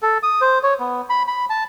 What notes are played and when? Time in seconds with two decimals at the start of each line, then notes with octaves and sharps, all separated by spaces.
0.03 A4
0.23 D#6
0.41 C5
0.63 C#5
0.80 B3
1.10 B5
1.28 B5
1.50 A5